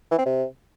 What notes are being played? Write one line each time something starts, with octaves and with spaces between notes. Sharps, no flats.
E3
C4
C3